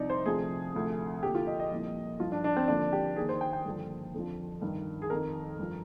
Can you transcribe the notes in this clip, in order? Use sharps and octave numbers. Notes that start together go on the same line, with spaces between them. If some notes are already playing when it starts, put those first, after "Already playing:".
Already playing: C2 C3 F3 D#4 D5
C5
D2 C3 F3 G#4
D2 C3 F3
D#2 D3 F3 G4
F4
D#5
D#5
C2 A#2 F3
G2 F3 F4
D4
D4
C4
D#2 D3 F3 D4
G4
D#2 D#3 G#4
C5
G5
G5
G2 D3 F3
F2 D3 F3
G2 D#3
G#4
F2 D#3 A#4
G2 F3